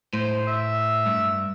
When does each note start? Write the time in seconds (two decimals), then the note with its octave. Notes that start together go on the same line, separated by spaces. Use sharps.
0.13 A2 C5
0.48 E5
1.06 G2